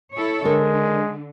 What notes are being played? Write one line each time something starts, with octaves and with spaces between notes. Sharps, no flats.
E4 A4 C#5
D3 G#3 A#4